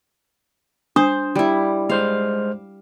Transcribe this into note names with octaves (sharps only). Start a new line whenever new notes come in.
D4 C5 D#6
G3 E4
G#3 C5 F5 F6